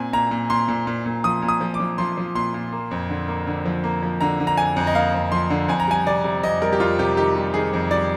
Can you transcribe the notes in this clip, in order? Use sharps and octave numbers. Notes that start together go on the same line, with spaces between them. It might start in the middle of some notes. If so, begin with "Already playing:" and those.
Already playing: A#2 C4 G#5
A#2 A#5
A#2
A#2 C6
A#2
A#2
A#2
F3 D#6
A#2
D#6
F3
D6
F3
F3 C6
F3
A#2 C6
A#2
A#3
F2
D3
A#3
D3
F3
A#3
F3
D3 A#5
D3
A#5
F2 G#5
F2
D#5
A#3 F5
F2
F3 C6
D3
F2 G#5
A#5
G3 G#5
C3 D5
C3
F2 D#5
G3 A#4
G4
F2 F4
C3 G4
D#3 G4
G3
D#3 G#4
F2
G3 D5